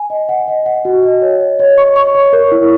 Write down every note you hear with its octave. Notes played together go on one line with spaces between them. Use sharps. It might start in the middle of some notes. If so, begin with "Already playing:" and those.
Already playing: G#5
D#5
F#5
D#5
F#5
F#4
D#5
C#5
C#5
C#5
C#6
C#6
C#5
A#4
E4